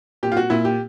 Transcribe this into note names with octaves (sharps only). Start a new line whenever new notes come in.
A#2 G4
F4
F#4
A#2 E4
G4